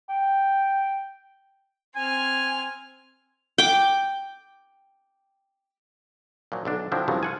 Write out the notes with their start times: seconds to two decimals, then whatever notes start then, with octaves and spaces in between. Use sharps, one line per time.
0.09 G5
1.95 C4 G#5 F6
3.58 G5 D6
6.52 A#2 F3 F#3
6.65 B1 D3 D4
6.92 D3 F3 F#3 C4 D4 E4
7.08 C2 G2 C#3 F3 F#3
7.23 F4 F#5 G#5